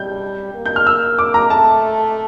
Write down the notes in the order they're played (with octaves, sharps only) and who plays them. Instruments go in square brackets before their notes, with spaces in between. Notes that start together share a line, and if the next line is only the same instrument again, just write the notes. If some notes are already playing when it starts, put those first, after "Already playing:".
Already playing: [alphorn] G3 [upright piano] G6
[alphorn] A#3
[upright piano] G6
F6
E6
D6
A#5
[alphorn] A3 [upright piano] A5